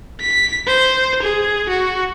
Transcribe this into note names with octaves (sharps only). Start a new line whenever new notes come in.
B6
C5
G#4
F#4